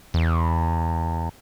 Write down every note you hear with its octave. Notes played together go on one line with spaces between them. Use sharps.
E2